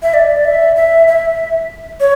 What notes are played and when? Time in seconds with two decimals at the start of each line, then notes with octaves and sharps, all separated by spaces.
0.03 E5
0.14 D5
0.45 E5
0.76 E5
1.08 E5
2.00 C#5